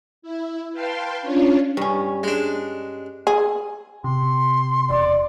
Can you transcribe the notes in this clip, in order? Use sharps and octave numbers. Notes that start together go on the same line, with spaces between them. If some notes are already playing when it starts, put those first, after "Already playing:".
E4
B4 F5 G5 A5 C6
C#4 D4 F4 C#5
G2 C#4
G#3 D4
G#4
C3 C6
E1 D5